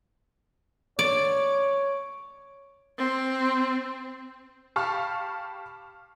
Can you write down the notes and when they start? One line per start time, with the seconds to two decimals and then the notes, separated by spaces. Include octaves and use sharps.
0.99 C#5 D5
2.99 C4
4.76 G4 F5 A5 B5 C#6 F6